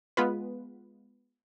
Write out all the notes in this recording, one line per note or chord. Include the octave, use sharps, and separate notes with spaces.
G#3 B3 F4 B4